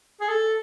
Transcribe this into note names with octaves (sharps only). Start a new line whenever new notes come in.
G#4
A4